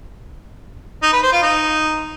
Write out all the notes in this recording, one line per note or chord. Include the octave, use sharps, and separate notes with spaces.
D#4
B4
C5
F4
D#4